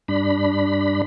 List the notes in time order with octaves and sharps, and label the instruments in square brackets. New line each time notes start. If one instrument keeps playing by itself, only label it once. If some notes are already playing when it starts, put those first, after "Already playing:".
[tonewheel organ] G2 D4 B5